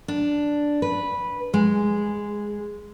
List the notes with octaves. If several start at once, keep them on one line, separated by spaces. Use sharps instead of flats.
D4
B4
G#3